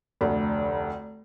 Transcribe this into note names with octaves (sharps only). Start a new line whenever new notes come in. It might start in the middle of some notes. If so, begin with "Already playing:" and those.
F1 D2